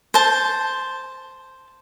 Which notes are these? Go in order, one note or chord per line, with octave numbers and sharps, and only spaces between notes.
C5 A5